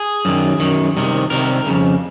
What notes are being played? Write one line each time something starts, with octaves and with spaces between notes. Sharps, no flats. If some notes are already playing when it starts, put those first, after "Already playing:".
Already playing: G#4
F#2 D#3
F#2 D#3
C2 C3 D#3
C2 C3 D#3 A#4
F2 C#3